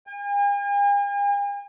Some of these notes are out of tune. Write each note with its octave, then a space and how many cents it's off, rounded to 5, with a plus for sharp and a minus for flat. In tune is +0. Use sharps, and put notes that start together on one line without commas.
G#5 -45